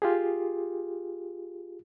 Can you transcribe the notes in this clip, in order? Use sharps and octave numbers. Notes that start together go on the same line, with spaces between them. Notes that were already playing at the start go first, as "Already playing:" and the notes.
F4 G4 G#4